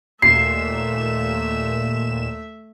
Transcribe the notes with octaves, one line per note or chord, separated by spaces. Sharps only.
D#2 A#2 A3 E5 C7 E7